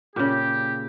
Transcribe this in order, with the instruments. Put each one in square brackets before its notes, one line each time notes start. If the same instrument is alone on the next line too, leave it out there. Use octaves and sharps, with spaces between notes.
[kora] A#2 C#3 [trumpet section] G4